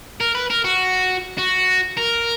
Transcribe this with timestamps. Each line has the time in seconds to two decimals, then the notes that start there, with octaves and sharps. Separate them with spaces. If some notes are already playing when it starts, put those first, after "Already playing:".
0.21 A#4
0.35 B4
0.50 A#4
0.65 F#4
1.39 F#4
1.98 A#4